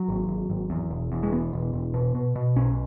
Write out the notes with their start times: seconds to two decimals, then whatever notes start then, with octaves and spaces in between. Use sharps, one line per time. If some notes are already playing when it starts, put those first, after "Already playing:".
Already playing: F#3
0.09 G#1
0.29 G#1
0.50 G#1
0.70 E2
0.91 E1
1.12 E2
1.23 G#3
1.32 E1 B3
1.53 E1
1.74 E1
1.94 B2
2.15 B2
2.36 B2
2.56 B1 C#4